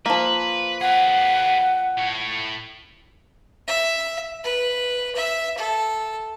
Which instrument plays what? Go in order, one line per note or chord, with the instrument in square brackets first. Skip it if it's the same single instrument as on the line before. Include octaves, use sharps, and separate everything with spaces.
[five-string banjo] F3 A#3 [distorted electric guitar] B4
[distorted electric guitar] G#4 B4 [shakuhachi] F#5
[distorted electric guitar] A2 C#5
[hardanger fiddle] E5
B4
E5
A4